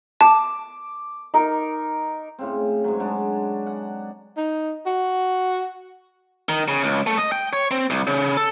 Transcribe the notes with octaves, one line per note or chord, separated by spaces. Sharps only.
A5 D6
D#4 A#4
A2 C#3 C4
G#2 F#3
F#3 G#3 D4
F#5
D#4
F#4
D#3
C#3
C#2
A3
D#5
G5
C#5
C4
C2
C#3
A4